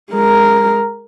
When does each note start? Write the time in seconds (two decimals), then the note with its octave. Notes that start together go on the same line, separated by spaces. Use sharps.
0.11 G#3 A#4